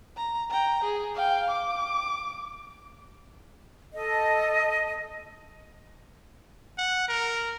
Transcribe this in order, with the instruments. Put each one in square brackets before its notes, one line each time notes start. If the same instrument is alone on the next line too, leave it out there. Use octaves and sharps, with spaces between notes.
[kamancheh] A#5
G5 A#5
G#4
F5 G5
D6
[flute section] A4 D#5
[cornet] F#5
A#4